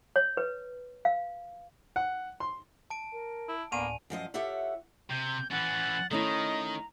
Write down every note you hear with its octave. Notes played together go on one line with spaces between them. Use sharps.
C#5
B4
F5
F#5
C6
A5 D7
A#4
E4
D2 A2 A#3 B3 D5 G#5 D#7 F7
F#2 F3 D#5 F5
F4 G4 A4 C#5 E5 F#5
C3 G6
E3 C#4 F#5 A6
D#3 A3 C#4 E4 D#5 A#5